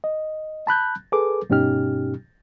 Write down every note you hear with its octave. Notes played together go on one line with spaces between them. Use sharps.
D#5
A5 B5 F#6 G6
G#4 A4 B4 D6
G2 B2 C#4 D#4 G4 F6